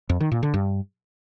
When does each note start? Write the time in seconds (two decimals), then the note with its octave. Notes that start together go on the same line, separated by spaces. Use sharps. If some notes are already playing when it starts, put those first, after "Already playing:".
0.09 F2
0.20 D#3
0.32 A#2
0.43 D3
0.54 G2